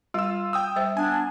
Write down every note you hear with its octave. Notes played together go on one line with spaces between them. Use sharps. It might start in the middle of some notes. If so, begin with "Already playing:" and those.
G3 F4 E6
G5 D#6 E6
G3 C5 E5
B3 D4 G#5